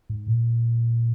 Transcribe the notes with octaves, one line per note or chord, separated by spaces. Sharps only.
G#2
A#2